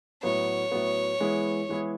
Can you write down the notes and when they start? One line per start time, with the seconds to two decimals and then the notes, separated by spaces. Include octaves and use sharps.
0.23 A2 F#3 B3 C#5
0.72 A2 F#3 B3
1.20 E3 G#3 B3 E4 G#4
1.69 E3 G#3 B3 E4 G#4